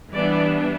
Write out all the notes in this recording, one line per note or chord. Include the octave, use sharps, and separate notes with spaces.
E3 G3 B3 D4 D5